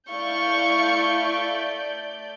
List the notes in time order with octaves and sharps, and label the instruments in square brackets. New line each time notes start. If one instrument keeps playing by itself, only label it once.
[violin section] A3 D5 G6 [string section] E4 F5 C#6